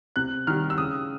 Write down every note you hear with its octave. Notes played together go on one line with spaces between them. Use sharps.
C3 F#6
D#3 G3 F6
E6
C#3 D#6